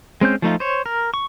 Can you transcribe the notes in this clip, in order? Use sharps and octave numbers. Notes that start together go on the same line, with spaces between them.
G#3 C4 C#4 G6
F3 A3 D#4 F4
C5 C#5
A#4
C#6